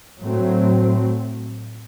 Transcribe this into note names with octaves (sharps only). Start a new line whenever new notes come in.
A2 F#3 A3 C4